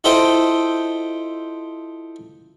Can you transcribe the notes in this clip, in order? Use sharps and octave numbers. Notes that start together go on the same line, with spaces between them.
E4 F4 A4 C5 D#5 G5